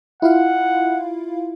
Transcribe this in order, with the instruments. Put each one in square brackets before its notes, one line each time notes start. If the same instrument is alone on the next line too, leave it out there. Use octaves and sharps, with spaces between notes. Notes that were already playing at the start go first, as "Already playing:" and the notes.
[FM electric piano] E4 F4 F5 [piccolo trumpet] F#5